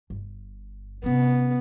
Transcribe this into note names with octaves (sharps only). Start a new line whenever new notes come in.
G1
C3 B3 C#4